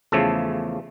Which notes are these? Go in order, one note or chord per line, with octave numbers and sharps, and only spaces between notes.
E2 C#3 F3 A3 A4